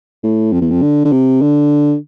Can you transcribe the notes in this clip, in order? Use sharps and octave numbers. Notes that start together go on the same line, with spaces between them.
A2
F2
E2
F2
D3
D3
C3
D3